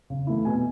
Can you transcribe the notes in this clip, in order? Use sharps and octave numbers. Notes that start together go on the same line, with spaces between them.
C#3
E3 A3 E4
B2 G#5